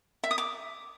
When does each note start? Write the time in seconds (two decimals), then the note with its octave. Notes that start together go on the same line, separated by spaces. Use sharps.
0.24 E5
0.31 D#6
0.38 D6